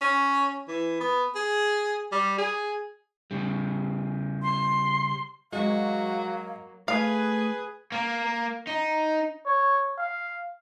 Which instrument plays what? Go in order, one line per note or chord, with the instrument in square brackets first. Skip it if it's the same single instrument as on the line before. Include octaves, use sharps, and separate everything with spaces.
[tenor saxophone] C#4
E3
B3
G#4
G3
G#4
[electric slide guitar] C#3 G3
[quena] C6
[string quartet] F#3 A#3 [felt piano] G#3 [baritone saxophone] F#4 [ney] F5
[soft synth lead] A3 [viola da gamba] G#4 [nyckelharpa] B4 G#5 [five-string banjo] F5
[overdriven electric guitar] A#3
D#4
[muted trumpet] C#5
F5